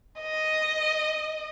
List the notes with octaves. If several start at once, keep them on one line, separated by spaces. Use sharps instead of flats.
D#5